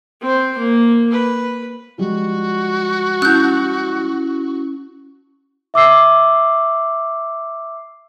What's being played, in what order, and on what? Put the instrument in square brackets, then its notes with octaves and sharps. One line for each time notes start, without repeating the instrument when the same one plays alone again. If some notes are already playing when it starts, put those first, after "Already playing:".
[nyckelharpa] C4 C5
A#3
B4
[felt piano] F3 G3 G#3 [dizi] F#4
[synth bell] C#4 E4 [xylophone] F#6 G6
[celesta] E5 D6 E6 C7